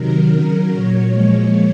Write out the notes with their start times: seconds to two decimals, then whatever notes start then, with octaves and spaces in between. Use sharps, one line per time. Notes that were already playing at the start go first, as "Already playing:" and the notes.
Already playing: C3 D#3 F#3 A#4
0.31 C#3 F#3
0.68 A#2 F#3 C#5
1.07 A#2 F3 G#3